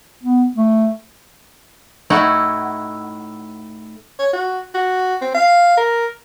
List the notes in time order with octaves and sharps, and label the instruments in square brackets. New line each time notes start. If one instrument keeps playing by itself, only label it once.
[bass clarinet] B3
A3
[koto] A2 A3 D#4 E4 F#4 F#5
[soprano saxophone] C#5
F#4
F#4
C4
F5
A#4